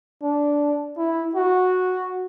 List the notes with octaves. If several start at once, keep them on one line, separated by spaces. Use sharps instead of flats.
D4
E4
F#4